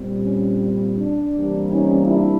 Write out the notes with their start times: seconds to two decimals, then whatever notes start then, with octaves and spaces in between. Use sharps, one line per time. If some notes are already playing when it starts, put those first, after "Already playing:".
Already playing: A#2 G3 C4
0.23 C#4
0.97 D4
1.33 C3 E3 G3 A#3
1.70 C#4 D#4
2.07 D4 E4